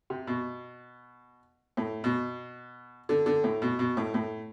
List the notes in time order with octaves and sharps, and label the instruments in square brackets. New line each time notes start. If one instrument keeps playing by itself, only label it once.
[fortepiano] C3
B2
A2
B2
D3
D3
A2
B2
B2
A2
A2